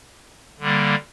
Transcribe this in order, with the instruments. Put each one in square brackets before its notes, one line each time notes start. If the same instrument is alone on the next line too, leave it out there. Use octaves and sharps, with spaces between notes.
[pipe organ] D3 G3 A#3